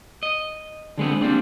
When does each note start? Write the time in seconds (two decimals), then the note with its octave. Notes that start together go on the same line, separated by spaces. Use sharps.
0.23 D#5
0.98 D3 G#3 B3 C4
1.21 G3 A#3 C4 D4